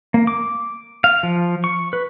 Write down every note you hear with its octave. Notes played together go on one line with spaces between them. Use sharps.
A#3
D6
F5
F3
C#6
B4